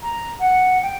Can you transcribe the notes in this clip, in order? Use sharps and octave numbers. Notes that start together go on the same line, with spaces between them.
A#5
F#5
G5